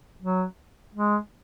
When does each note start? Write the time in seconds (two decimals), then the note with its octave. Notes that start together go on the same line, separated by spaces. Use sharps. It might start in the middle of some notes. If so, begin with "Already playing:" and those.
0.22 F#3
0.94 G#3